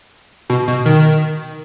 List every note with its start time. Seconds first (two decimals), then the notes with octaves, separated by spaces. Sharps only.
0.50 B2
0.68 B2
0.86 D#3